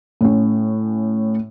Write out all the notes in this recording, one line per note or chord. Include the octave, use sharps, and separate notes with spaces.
A2 C#4